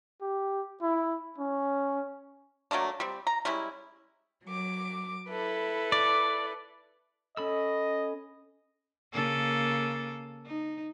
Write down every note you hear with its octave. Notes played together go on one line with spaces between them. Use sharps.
G4
E4
C#4
F#3 A3 A#3 D4
G3 C4
A#5
G3 G#3 C#4 E4
F#3 D6
E4 A4 B4
D5
C#4 A4 D#5 B5 E6
C#3 A#3 A4
D#4